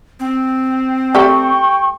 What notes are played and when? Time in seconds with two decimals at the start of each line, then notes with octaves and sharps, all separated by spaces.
0.20 C4
1.15 G3 A3 G4 G5 C#6